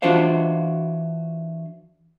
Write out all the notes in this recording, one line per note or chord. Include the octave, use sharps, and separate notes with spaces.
E3 D4 F4 F#4 C5 F5